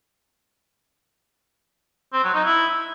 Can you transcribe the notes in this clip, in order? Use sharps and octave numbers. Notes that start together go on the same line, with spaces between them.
C4
F#3
D#4
E4